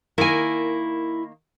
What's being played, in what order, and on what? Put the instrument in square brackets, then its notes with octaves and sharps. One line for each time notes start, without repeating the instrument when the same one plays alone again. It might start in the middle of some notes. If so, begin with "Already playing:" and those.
[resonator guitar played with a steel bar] D#3 A#3 [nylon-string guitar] E4 G#5